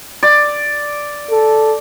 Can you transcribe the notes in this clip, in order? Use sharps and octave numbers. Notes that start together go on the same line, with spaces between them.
D5
A4